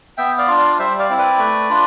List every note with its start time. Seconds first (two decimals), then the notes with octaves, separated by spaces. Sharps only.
0.17 B3 E5 G5
0.38 D5 F5
0.48 D4 F4
0.58 D5 F5
0.79 G3 C5 E5
0.99 D5 F5
1.09 C4 E4
1.18 B4 D5
1.39 A3
1.70 D4 F4